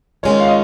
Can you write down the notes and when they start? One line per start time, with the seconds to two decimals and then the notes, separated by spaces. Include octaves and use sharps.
0.23 D#3 G#3 C#4 F4 C#5
0.40 F5
0.48 D#5